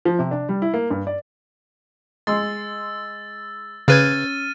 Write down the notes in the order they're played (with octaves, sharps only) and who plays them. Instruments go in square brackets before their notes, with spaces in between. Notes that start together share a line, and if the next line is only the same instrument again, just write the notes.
[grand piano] F3
C3
D4
G3
E4
A#3
G2
D5
[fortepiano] G#3 C6 [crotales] E6 A6
[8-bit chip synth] C#3 B4 G#6 [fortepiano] C#4 [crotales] F6 A6 D#7